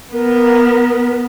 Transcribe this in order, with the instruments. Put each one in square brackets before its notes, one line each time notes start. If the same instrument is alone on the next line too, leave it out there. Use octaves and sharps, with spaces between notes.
[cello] B3 [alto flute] A#4